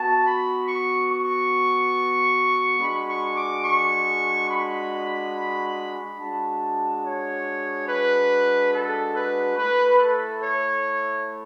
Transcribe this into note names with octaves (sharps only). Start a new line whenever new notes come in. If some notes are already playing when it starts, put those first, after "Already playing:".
Already playing: B3 F#4 A5
B5
C#6
C#6
G#3 D4 F#4 B5
C#6
D6
C#6
B5
G#3 D4 F#4 A5
C#5
B4
A4
B4
A3 E4 B4
A4
C#5